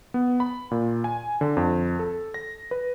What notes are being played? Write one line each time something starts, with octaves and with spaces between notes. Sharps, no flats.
B3
B5
A#2
G#5
D3
F2
A4
A#6
B4